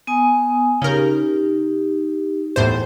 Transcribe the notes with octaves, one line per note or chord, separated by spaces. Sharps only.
B3 G#5 D#6
C#3 D#4 G4 A#4
E2 A2 C5